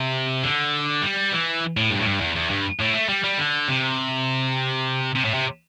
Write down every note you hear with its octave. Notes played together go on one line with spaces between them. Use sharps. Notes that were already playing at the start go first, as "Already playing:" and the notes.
Already playing: C3
D3
G3
E3
A2
G2
A2
G2
E2
E2
G2
A2
A3
G3
G3
D3
C3
C3
A2
C3